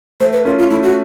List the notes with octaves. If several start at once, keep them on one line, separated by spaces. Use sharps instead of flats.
A3 C5
B4
C#4 F4 A#4
F4
A3 E4
F#4